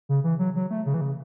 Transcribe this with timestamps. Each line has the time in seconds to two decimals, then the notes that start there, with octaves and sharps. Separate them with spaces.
0.09 C#3
0.24 E3
0.39 F#3
0.55 F#3
0.70 A3
0.86 C#3
0.94 E3
1.01 C#3